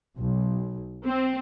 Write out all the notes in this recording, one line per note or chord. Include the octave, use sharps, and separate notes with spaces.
B1
C4